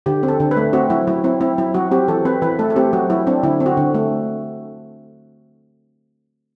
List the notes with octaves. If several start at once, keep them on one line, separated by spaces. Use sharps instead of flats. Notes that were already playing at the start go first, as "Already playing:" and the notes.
D3 G4
C4
A4
D3
B4
A3
C4 F#4
F#3 E4
F#3 E4
C4 E4
C4 E4
F#3 E4
F#3 F#4
C4 G4
E3 A4
C4 B4
E3 B4
A3 A4
A4
C4 G4
F#3 F#4
F#3 E4
C4 D4
D3 E4
C4
F#4
D3
A3